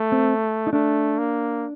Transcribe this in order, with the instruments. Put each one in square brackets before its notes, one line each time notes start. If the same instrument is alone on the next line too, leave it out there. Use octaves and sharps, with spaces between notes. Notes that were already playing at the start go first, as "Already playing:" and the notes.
Already playing: [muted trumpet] A3
[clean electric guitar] C4
D#4
[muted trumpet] A3 [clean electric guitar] D4
[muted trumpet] A#3